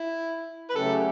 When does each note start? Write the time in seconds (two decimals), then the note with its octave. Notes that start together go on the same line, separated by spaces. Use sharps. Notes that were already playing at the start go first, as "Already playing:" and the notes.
Already playing: E4
0.70 B4
0.75 C#3 F#3 A3 C#4 G4 A4